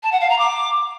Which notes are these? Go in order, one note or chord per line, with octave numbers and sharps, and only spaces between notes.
A5
F#5
F5
A#5
D6